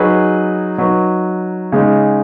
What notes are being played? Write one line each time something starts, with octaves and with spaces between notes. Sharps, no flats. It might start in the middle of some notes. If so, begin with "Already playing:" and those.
Already playing: F#3 D#4 G#4 B4
F#3 D#4 B4
C#3 G#3 D#4